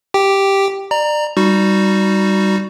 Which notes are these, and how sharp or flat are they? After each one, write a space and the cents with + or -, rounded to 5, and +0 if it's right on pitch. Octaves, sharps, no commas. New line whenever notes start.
G4 +0 G5 +0
D5 +30 A#5 +0
G3 +0 D#4 +0 F#4 +0